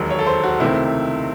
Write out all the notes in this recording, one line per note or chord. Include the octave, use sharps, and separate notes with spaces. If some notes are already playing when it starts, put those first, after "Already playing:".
Already playing: E1 D#2 D#3 F#3
C#5
A4
C5
F#4
C#2 C3 D#3 A3 C4 E4